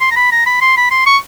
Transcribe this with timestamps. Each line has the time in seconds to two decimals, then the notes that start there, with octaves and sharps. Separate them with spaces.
0.01 C6
0.11 A#5
0.16 B5
0.32 A#5
0.46 B5
0.61 C6
0.77 B5
0.91 C6
1.06 C#6